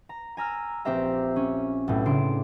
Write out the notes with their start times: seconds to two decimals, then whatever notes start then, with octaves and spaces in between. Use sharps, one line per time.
0.09 A#5
0.37 G#5 A#5 E6 F6
0.85 A#1 C4 G4 C5 E5 A#5
1.36 C#4
1.88 B1 A2
2.05 C#3 D4 C6 D7